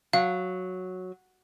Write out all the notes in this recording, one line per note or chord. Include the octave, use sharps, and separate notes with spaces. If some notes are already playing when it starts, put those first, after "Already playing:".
F#3 F5